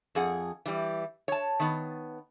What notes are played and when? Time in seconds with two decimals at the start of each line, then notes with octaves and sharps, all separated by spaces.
0.15 F2 G#4 F#5
0.66 E3 G3
1.28 C#5 A5
1.60 D#3 B3